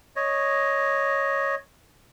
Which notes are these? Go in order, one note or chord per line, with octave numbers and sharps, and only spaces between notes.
C#5 D#5